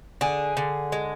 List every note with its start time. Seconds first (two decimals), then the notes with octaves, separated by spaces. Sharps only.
0.21 D3 G#4
0.57 D3
0.92 G#3